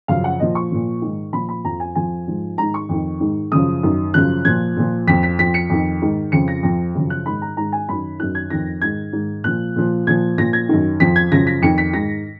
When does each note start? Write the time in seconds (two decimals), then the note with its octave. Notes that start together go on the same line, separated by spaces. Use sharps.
0.08 F#2 C#3 F3 F5
0.24 F#5
0.40 A#2 F3 D#5
0.55 C#6
0.71 A#2 F3
1.02 G#2 D#3
1.33 A#2 F3 B5
1.49 B5
1.64 F2 F3 A#5
1.80 G#5
1.95 F2 F3 G#5
2.27 G#2 F3
2.57 G#2 D#3 A#5
2.74 C#6
2.89 F2 D#3
3.20 G#2 D#3
3.52 F#2 C#3 F3 D#6
3.83 F#2 D#3
4.14 F#2 C#3 F3 F#6
4.45 A#2 F3 G#6
4.76 A#2 F3
5.07 F2 F3 B6
5.23 B6
5.39 F2 F3 B6
5.54 C#7
5.70 F2 D#3
6.01 G#2 D#3
6.32 F2 C#3 F3 C#7
6.48 A#6
6.63 F2 F3
6.95 F#2 C#3 F3
7.10 F#6
7.26 G#2 D#3 B5
7.42 A#5
7.57 G#2 D#3 A#5
7.72 G#5
7.89 F#2 D#3 B5
8.20 F#2 D#3 F#6
8.35 G#6
8.50 F2 D#3 A#6
8.82 G#2 D#3 G#6
9.13 G#2 D#3
9.44 A#2 F3 F#6
9.76 A#2 F3
10.07 A#2 F3 G#6
10.38 A#2 F3 A#6
10.53 G#6
10.69 F#2 D#3
11.00 F2 F3 B6
11.16 G#6
11.31 F#2 C#3 F3 A#6
11.47 B6
11.62 F2 D#3 C#7
11.78 B6
11.93 G#2 D#3 A#6